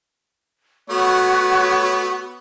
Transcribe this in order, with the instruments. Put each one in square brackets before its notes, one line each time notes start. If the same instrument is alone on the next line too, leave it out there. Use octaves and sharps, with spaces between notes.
[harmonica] A3 B3 [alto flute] F#4 [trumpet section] C#5